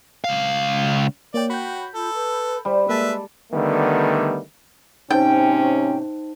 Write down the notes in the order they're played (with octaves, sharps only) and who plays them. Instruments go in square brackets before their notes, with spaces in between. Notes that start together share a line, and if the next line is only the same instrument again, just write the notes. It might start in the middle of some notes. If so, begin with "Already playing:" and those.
[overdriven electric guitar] C#2 F5
[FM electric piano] A#3 C#5 G5 [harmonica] D5
[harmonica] F#4 [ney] G5 [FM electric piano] B5 G6
[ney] F4 [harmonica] A4
[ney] B4
[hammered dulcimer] G3 [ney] C5
[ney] G#3 [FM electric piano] A#3 A4 A5 [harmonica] B4 E5
[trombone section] D3 D#3 G3 A3 B3
[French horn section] G#2 C3 C#4 [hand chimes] D#4 C5 [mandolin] G5